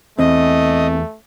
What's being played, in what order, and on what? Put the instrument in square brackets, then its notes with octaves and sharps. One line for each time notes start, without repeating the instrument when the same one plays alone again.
[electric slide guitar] E2 [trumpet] A3 [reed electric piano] C4 [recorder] D#5